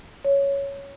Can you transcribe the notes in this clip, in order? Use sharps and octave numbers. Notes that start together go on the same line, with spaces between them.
C#5